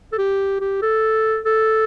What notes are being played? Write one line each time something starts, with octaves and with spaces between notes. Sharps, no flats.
A4
G4
G4
A4
A4